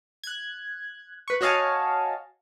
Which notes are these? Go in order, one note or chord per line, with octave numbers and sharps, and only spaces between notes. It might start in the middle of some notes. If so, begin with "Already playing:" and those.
F#6 G#6
B4 C#6
F#4 C#5 D#5 F5 G#5 A5